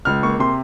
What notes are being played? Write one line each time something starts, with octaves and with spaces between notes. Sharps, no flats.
C#2 F6
A#3 C#6
C3 C6